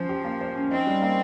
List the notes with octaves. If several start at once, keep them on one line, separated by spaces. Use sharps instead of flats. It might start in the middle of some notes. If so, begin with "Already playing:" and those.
Already playing: F3 C#4 C5
G4
A#3
C5
C#4
C4 D#4
G3
A#3